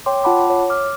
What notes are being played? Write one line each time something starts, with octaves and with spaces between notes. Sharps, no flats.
C#5 G5 C6 D6
F4 F#5 A5 B5 D6
C#5
D6 F6